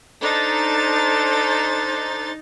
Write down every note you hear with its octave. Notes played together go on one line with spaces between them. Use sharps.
D4 D#4 A4 C5 A6